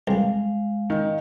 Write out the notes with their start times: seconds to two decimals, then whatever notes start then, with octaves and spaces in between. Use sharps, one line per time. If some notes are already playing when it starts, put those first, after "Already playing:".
0.07 C2 G#3 F5
0.90 D#3